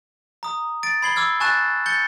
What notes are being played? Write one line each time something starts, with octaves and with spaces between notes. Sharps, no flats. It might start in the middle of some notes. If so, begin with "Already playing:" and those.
A#5 D#6
A6 D7
B5 G#6 C7 F#7 G7
D6 E6 F6 G#6
G#5 A5 C#6 F#6 A6 E7
G6 A6 C#7 G7